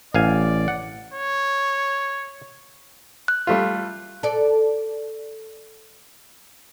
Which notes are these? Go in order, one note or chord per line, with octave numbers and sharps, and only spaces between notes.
A1 D5 F5 G#5
F#5
C#5
F#6
G3 A3 F4
A4 D5